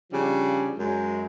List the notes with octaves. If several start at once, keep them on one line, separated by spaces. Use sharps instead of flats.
C#3 F3 G3 D4
F#2 G#3